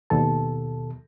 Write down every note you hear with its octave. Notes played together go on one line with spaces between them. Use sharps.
D#2 B2 A4 A5